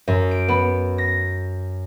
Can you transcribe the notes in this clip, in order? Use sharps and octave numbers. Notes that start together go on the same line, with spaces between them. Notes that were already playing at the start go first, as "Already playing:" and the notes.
F#2
D7
B3
A#6